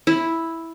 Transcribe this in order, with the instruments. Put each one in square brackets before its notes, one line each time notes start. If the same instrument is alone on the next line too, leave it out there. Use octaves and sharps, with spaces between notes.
[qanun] E4